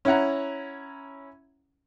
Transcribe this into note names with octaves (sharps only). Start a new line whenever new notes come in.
C#4 E4 F#5 A#5